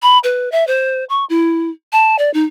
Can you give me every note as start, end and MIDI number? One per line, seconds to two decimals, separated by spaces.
0.02 0.18 83
0.24 0.49 71
0.52 0.66 76
0.67 1.04 72
1.09 1.25 85
1.29 1.70 64
1.92 2.16 81
2.18 2.32 74
2.34 2.45 63